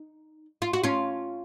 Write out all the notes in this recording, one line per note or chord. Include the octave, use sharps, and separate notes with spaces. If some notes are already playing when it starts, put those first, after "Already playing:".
Already playing: D#4
F4
F#4
C#4 F4